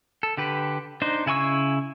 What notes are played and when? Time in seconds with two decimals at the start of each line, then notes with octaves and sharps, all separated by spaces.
0.23 A4
0.37 D3 G4 B4
1.02 D4 D#4 C5
1.26 C#3 E4 G#5 C#6 E6